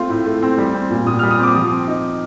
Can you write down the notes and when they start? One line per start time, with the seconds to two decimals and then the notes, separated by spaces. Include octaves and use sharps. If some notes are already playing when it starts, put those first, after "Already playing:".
Already playing: A3 C4 F4
0.09 A2
0.26 A3
0.42 C4
0.58 G3
0.74 C4
0.91 A#2
1.06 A#2 D#6
1.19 F6
1.23 G3
1.31 D#6
1.39 C4 D6
1.55 F3 D#6
1.72 C4
1.87 D#4